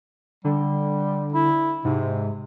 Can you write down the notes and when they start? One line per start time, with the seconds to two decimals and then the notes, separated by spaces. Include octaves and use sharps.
0.45 D3 G3
1.33 E4
1.85 G#2 C3